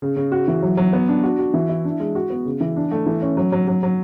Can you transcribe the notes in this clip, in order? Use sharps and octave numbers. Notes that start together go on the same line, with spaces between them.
C#3
C#3
F#4
E3
F#3
F#3
B3
D4
F#4
F#4
E3
E4
D4
G#3
F#4
B3
C#3
E3
D4
A3
E3
C#4
F#3
F#3
F#3
F#3